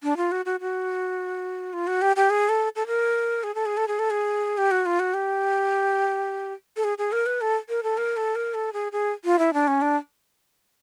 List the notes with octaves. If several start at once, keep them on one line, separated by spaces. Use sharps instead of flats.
D4
F4
F#4
F#4
F#4
F4
F#4
G4
G4
G#4
A4
A4
A#4
G#4
A4
G#4
A4
G#4
A4
G#4
G4
F#4
F4
F#4
G4
A4
G#4
G#4
A#4
B4
A4
A#4
A4
A#4
A4
A#4
A4
G#4
G#4
F4
E4
D4
C#4
D4